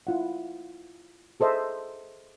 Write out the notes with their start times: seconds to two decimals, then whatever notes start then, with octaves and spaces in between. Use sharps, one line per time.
0.07 E4 F4 F#5
1.40 G#4 A4 C5 D#5 E5